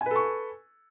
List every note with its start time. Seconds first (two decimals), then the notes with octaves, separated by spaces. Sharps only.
0.01 G#5
0.06 B4
0.11 A4
0.16 C#6